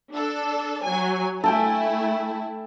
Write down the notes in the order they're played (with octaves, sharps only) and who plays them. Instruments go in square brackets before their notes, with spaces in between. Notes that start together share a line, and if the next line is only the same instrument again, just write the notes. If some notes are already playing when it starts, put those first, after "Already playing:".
[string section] D4 A4
F#3 G#5
[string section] A3 E4 [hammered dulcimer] A4 G5 G#5